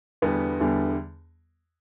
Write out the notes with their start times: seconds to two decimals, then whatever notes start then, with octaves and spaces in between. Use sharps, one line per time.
0.22 E2 D3 G3 B3
0.60 E2 D3 G3